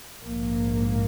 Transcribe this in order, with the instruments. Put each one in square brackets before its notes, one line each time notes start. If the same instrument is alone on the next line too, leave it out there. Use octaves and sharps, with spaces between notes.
[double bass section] A#1 G#2 A#3